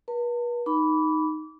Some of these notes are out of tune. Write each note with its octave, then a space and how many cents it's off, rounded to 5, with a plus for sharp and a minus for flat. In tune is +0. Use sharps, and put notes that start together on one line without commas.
B4 -40 A5 +45
D#4 +0 B5 +0 D6 -30